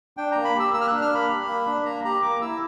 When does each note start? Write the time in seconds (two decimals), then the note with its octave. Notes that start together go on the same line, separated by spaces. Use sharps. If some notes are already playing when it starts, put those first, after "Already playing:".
0.17 D4 G5
0.32 A#3 A#5
0.45 B5
0.55 G4 E6
0.73 A#3 E6
0.81 F6
0.87 D4 F#6
1.02 F6
1.10 A#3 B5
1.29 G4
1.48 A#3
1.66 D4
1.85 A#3 A#5
2.04 G4 A#5
2.22 A#3 D6
2.41 E4 E6